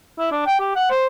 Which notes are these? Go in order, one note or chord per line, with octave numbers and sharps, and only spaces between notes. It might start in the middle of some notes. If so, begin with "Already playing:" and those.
E4
D4
G5
G4
F#5
C5